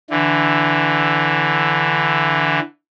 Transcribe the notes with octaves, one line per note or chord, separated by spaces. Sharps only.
D3 E3